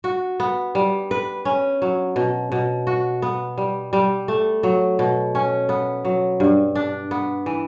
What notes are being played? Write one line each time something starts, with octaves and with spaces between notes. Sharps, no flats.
F#4
B3
G3
B4
C#4
F#3
B2
B2
F#4
B3
G3
G3
A3
F#3
B2
C#4
B3
F#3
G2
D4
B3
E3